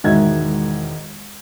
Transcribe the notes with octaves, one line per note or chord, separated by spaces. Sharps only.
E1 G#2 D#3 F#4 E5 G#6